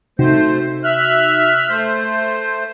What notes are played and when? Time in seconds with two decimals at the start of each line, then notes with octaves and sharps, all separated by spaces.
0.19 C3 A3 D#4 F#4 C5
0.84 E5 F6 F#6
1.70 A3 C5 G6